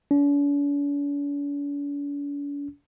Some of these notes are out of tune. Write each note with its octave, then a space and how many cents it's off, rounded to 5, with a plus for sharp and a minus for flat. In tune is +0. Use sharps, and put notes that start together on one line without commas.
D4 -45